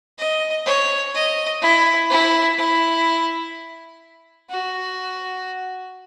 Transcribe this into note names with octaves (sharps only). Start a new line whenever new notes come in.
D#5
C#5
D#5
E4
E4
E4
F#4